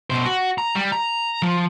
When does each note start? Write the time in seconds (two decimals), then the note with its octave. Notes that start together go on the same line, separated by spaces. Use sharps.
0.10 B2 C5
0.26 F#4
0.58 A#5
0.75 G3
0.92 A#5
1.42 F3